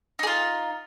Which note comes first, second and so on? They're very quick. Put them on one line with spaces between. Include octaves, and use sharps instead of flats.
D#4 G#4 F4